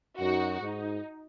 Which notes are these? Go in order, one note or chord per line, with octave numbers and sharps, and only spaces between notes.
F#2 D#4 F#4
G#2 D#4